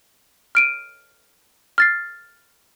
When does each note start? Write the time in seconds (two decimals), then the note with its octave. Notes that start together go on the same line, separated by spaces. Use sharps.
0.55 F6 D7 D#7
1.78 F6 A6 C7